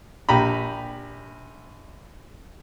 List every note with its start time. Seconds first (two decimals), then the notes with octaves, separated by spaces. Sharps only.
0.29 A#1 G4 A#5 B5